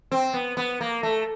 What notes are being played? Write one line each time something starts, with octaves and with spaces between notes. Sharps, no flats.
C4
B3
B3
A#3
A3